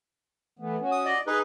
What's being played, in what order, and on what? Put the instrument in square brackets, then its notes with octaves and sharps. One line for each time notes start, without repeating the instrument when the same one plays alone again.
[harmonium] E3 A3 B3
C#4 F#4
[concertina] D#6
D5 D#5
[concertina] D#4 G#4 B4 [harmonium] D#5